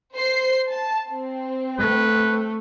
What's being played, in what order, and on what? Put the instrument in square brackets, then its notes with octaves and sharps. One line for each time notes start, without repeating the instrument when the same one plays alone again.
[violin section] C5 C7
A5
C4
[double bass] A3 [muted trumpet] B4